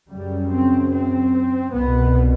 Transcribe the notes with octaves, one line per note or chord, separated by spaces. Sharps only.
F#2 C#3 G3
C4
C4
C2 B2 B3